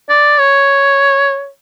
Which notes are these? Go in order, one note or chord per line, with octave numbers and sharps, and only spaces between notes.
D5
C#5